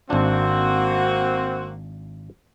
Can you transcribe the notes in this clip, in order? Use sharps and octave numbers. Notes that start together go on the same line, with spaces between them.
G#1 A#3 C4 D4 F#4